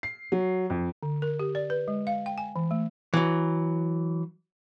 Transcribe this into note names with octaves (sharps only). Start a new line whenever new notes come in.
C7
F#3
F2
D3
A#4
G4
D5
B4
G#3
F5
G5
G#5
E3
A3
E3 F#3